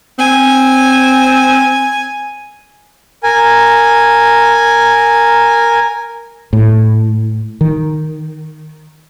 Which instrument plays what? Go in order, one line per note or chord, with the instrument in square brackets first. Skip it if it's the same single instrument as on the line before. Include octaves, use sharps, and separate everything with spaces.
[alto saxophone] C4 [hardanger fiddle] G#5
[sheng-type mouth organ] A#4 G#5
[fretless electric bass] A2
D#3